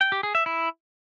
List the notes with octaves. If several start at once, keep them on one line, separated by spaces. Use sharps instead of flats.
G5
G4
G#4
E5
E4